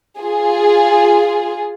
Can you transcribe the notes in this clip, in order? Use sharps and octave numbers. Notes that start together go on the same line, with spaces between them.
F4 G#4